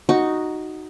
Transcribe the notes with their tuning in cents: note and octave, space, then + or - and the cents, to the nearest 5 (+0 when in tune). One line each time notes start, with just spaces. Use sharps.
D#4 +0 F#4 +0 C#6 +0